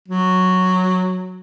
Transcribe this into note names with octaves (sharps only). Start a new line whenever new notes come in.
F#3